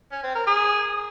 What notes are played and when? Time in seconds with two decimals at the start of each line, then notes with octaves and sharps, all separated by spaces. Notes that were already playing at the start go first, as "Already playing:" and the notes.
0.12 C#4
0.23 C4
0.35 A#4
0.47 G#4